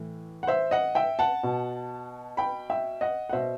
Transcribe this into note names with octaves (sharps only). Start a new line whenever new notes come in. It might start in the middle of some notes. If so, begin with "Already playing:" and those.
Already playing: A2 E3
F#5
C5 E5
D#5 F#5
E5 G5
F#5 A5
B2
G5 B5
E5 G5
D#5 F#5
F#5
B2 C5 E5